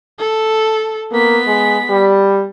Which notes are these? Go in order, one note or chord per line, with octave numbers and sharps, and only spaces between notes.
A4
A#3 B3 B6
G#3
G3